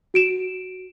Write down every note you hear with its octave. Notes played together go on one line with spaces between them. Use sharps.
F#4 D7 E7